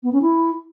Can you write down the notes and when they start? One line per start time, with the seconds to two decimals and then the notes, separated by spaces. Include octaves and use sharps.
0.03 B3
0.13 C#4
0.22 E4